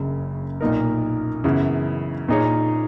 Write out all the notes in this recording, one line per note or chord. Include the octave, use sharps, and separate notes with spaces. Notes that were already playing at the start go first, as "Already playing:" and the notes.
Already playing: F#1 F#2 C#3
B1 A#2 A#3 D#4 A#4
F#2 C#3 E3 B3 E4
A#2 A#3 D#4 G#4 C#5